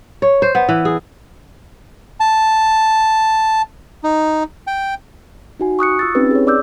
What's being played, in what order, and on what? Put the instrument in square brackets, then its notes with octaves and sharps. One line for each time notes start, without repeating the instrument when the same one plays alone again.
[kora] C#5
C5
B3
E3
G#4
[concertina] A5
D#4
G5
[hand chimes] D#4 F#4 G#5
C#6 D#6 F#6 C#7
F4 E6 A6
C4 C#4 D#4 G4 B4
G#4 C#5
D5 D6 E6 G6